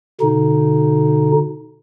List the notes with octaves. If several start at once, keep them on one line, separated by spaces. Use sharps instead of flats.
B2 D3 D#4